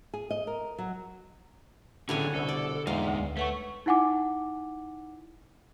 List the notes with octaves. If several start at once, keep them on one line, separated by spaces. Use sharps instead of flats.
G#4
D#5
A#4
F#3
A2 D3 E3 C#4 G4 G#4 C#5 G#5
C2 B2 A4
D5
E2 A#2 G#3 A3 D#4 F5
D2
A3 B4 C#5 F#5 C#6
D#4 E4 F#5 G#5 D6